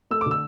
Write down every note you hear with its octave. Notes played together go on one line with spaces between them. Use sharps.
A3 E6
D6
D3
E6